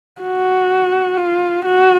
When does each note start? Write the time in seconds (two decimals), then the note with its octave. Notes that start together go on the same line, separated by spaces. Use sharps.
0.22 F#4
1.17 F4
1.65 F#4